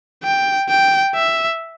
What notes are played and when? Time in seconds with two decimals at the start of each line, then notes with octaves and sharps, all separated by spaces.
0.24 G5
0.69 G5
1.15 E5